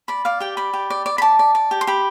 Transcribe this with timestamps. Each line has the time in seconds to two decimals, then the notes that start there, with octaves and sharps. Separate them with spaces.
0.08 D5 B5
0.25 D5 F5
0.40 G4 G5
0.57 D5 B5
0.73 G4
0.90 D5
1.06 D5
1.18 B5
1.22 D5 A5
1.39 D5
1.55 D5
1.71 G4
1.81 C6
1.87 G4 B5